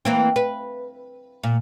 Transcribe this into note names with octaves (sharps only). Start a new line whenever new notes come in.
E3 A#3 C4
B4
A#2